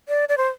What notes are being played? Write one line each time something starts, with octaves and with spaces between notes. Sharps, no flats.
D5
D5
C5